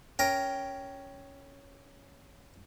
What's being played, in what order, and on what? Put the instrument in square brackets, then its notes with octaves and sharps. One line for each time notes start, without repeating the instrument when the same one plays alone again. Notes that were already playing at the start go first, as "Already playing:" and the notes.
[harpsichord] C#4 A#4 [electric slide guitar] G5